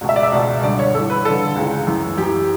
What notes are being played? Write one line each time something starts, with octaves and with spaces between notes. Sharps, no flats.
C#2 B2
E5
D5
E5
C#2 B2
G2 D3 D5
C#5
G2 E3 A4
B4
G2 D3 A4
C#2 C#3 E3
F#2 E3
F#2 E3 G4